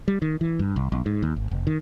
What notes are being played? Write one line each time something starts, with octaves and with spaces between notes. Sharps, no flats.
G3
D#3
E3
G2
C2
B1
G#2
D#2
G#1
F1
D#3